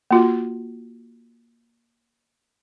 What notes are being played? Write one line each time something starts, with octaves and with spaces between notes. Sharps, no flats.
A#3 F4 F#4